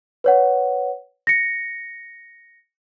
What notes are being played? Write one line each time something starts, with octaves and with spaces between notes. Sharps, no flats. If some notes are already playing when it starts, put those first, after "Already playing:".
B4 C#5 F#5
A#6 C#7